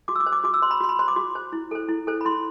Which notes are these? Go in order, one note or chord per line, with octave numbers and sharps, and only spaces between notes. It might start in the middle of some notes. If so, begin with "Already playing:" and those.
F#4 D6
E6
D6
C5
D6
F#4 D6
E6
C5 C6
B5
F#4 C6
B5
C5 C6
D6
F#4
C5
E4
A4 C5
E4
A4 C5
B5
E4 C6